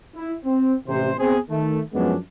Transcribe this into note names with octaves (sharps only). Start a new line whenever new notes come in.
E4
C4
A1 C3 C5
B3 C4 G#4
D#3 A3
F#2 F3 G#3 B3 C#4 D4